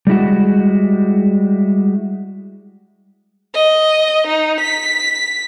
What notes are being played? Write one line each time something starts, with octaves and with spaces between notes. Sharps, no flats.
G3 G#3 E4 F#4
D#5
D#4
B6